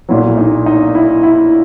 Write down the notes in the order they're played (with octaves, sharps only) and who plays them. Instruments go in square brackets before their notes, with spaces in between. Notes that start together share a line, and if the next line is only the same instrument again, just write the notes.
[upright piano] B1 A#2 F#3 E4
D#4
D#4
E4
E4